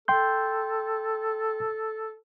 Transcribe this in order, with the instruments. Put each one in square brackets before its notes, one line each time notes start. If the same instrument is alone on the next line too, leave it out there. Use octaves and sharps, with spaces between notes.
[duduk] A4 [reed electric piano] G5 C6 G6